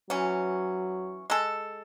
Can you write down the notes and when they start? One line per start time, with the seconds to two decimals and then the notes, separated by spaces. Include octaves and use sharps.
0.10 E3 F#3 C#4
1.30 G#3 A4